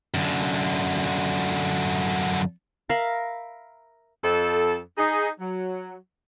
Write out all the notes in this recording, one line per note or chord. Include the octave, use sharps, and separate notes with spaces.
F#2 D3
A#4 E5 F5 B5
F2 A4
D#4 G#4
F#3